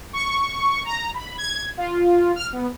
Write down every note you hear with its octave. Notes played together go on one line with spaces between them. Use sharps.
C#6
A#5
B5
G#6
F4
F6
B3